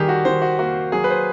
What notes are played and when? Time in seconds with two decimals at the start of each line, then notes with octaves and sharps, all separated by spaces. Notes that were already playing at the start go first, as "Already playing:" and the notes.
Already playing: D#3 G3 G4 G#4
0.09 F#4
0.25 D#3 C5
0.42 F#4
0.59 A#3 F#4
0.92 F#3 G#4
1.04 B4
1.10 C5